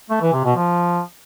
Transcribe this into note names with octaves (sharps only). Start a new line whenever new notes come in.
A3
E3
C3
B2
F3